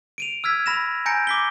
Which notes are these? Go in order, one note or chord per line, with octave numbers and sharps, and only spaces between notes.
D7 D#7 F7
E6 F6 G#6 B6
B5 A#6 E7
G#5 A#5 G6 A#6 C#7 D7
D6 B6 G7